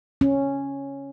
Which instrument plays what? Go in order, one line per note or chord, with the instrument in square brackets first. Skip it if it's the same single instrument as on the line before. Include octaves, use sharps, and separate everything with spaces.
[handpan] C#4